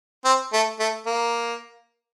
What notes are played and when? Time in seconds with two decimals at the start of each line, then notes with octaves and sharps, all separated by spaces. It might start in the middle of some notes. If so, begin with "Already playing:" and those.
0.24 C4
0.53 A3
0.79 A3
1.06 A#3